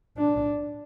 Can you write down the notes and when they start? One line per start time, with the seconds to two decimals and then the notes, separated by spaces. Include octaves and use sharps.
0.18 D4